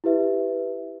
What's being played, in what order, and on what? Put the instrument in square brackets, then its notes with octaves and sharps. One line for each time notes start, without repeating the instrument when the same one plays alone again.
[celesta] E4 G4 B4 E5